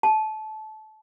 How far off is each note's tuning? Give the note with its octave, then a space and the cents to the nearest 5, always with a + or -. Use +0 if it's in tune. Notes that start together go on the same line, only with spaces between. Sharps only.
A5 -25